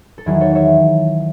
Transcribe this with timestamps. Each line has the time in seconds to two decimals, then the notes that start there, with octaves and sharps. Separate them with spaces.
0.18 A4
0.26 E2 D#3 F#3 E4 G#4
0.41 A4 C#5
0.55 C#5 E5